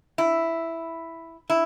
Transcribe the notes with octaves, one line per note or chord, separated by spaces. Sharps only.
E4
E4